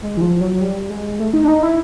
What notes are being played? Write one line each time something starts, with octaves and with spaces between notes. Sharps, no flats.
G#3
E3
F3
F#3
G3
G#3
A3
D#4
D4
D#4
E4